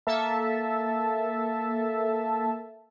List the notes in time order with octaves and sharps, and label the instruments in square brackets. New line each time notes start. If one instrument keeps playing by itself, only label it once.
[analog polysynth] A#3 A4 E5 A5